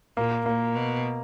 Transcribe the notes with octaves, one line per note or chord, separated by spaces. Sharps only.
A#2 A#3
A#2 A#3
B2